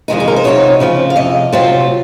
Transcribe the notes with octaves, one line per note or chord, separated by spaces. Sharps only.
F2 C3 D#3 G#3 D#4
G#4
A#4
C5
F2 C3 F#3 C4 D#4 C#5
C#3 F3 C4 F4
F5
F2 C3 D#5
C3 F#3 C4 F4